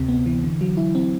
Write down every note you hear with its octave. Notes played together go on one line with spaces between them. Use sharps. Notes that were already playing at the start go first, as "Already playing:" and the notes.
Already playing: D2 C3 C4
B3
E3
D3
F#3
E4
C4